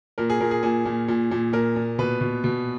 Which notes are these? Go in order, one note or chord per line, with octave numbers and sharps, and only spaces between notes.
A#2 A#4
G#4
A#2 A#4
G#4
A#2 G#4
A#2
A#2
A#2
A#2 A#4
A#2
B2 B4
B2
B2